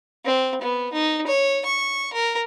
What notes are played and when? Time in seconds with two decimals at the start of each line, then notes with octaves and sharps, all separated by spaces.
0.25 C4
0.61 B3
0.93 D#4
1.27 C#5
1.65 C#6
2.13 A#4